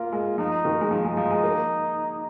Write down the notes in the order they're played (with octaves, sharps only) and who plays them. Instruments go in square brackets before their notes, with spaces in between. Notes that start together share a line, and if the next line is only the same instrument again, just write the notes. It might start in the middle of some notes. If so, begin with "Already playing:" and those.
Already playing: [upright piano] A#3 A#4 [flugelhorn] F4
[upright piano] G#3
[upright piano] F3 [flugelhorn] D#4
[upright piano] D#3
G#3
[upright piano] F3 [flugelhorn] D#4
[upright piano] G#3
F3
G#3
A#3